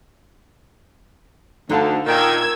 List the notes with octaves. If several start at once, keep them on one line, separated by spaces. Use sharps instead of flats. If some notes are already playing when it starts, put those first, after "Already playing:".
D2 D3 D#4 F5 A5
A#2 D#3 G5 E6 G#6